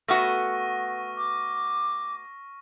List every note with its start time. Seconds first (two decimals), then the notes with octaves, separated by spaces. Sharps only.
0.08 A3 B3 F#4 C#6 F6 A#6
1.17 D6